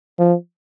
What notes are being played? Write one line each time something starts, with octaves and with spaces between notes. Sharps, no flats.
F3